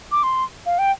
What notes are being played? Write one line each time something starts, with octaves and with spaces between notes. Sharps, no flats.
D6
C6
F5
G5